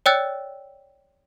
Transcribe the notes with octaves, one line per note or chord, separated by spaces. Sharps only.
C#5 D5 G5 E6 F#6 A6